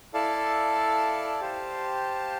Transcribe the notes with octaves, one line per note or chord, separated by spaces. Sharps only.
E4 A4 D5 F5 A5
G4 C5 F5 A5